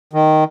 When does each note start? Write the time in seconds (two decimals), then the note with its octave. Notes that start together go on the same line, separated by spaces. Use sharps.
0.13 D#3